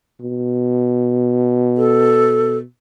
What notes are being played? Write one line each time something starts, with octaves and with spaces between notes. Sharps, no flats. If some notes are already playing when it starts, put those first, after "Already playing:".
B2
A4